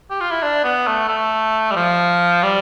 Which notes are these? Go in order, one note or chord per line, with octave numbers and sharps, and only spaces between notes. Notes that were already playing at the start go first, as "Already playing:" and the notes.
G4
F4
E4
D4
B3
A3
A3
G3
F3
G3